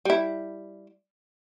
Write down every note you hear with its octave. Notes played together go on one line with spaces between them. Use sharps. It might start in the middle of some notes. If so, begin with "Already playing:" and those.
G3 E4